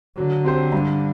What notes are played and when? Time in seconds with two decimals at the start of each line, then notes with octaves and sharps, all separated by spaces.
0.17 D3 F#3
0.44 C4 G4 C5
0.72 G2